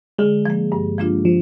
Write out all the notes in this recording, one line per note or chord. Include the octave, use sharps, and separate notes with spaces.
D3 G#3
F3 A#3
G2
F3 A#3 D4 F4
F3